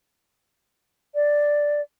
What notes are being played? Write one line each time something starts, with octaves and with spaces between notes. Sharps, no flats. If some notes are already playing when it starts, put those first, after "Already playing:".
D5